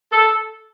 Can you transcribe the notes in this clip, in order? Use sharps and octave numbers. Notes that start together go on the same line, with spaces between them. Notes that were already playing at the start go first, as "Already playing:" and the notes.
A4